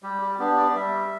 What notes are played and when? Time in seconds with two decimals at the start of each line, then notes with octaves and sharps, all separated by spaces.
0.03 G3 G4
0.22 G4
0.39 B3 D4 G4
0.57 D5
0.75 G3 E5